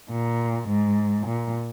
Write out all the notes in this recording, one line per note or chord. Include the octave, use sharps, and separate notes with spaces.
A#2
G#2
A#2